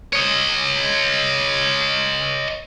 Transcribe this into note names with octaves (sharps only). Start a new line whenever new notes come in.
C#5 D#5